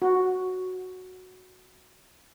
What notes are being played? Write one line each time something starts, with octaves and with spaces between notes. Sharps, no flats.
F#4